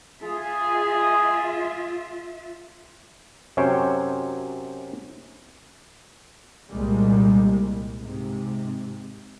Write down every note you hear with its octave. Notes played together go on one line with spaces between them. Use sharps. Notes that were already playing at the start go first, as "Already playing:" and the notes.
F4 G#4 E5
F#2 C3 C#4 C5 C#5 G5
C2 A#2 G3 G#3 A#3
G#2 C3